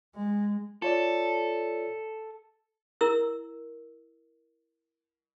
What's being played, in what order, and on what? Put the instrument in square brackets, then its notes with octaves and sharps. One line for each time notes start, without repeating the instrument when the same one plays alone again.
[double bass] G#3
[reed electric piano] F4 C#5 D5 [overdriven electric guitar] A4
[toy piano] E4 A#4 E6